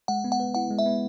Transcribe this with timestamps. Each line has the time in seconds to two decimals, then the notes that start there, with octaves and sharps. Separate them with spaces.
0.08 G#3 F#5
0.24 B3
0.32 F#5
0.40 B4
0.54 E4 F#5
0.70 G#3
0.79 E5
0.86 B3